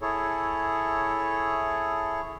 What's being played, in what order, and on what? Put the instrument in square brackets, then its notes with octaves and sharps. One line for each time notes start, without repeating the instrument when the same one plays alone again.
[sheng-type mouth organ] E4 G#4 A4 C#5